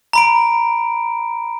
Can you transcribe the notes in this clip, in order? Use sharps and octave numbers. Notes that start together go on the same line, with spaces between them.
A#5 B5 D7